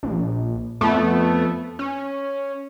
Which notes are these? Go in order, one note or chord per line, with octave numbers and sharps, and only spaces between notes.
A#1
F2 A3 B3
C#4